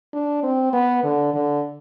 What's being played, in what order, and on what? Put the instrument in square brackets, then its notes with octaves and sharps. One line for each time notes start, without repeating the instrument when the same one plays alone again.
[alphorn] D4
C4
B3
D3
D3